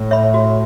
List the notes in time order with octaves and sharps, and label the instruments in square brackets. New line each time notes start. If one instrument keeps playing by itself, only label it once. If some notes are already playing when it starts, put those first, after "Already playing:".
Already playing: [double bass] A2
[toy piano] C#5 E5 B5
F#4